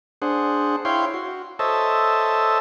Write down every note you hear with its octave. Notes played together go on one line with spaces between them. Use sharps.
D4 G#4 C5 F#5
E4 C#5 F5 G5 C6
F#4
A4 C5 C#5 D#5 E5 A5